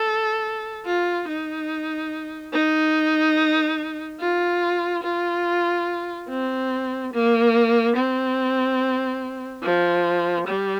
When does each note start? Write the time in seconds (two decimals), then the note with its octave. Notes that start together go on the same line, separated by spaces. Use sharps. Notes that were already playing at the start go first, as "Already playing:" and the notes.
Already playing: A4
0.85 F4
1.28 D#4
2.53 D#4
4.20 F4
5.03 F4
6.29 C4
7.13 A#3
7.96 C4
9.63 F3
10.47 G3